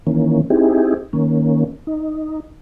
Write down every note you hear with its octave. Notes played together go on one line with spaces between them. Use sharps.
D#3 E3 A#3 C#4
C4 D#4 E4 G4 G#4
D#3 A#3 C#4
D#4